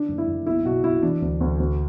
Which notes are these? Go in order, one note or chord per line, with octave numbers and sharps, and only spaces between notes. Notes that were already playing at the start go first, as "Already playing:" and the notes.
Already playing: D3 D4
F#1
E4
F#1
B1 E4
B2 F#4
B2 E4
E3 D4
D2
D2
D2